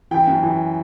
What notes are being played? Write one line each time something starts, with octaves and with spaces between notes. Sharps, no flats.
E3 G5
F#2
E3